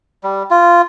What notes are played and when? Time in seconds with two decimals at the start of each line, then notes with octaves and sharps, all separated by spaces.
0.24 G3
0.50 F4